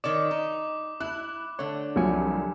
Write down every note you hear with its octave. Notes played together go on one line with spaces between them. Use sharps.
D#3 C#5 D5 D6
D#4
E4 F#6
D3 A3 C#5
C2 F3 F#3 G#5 C#7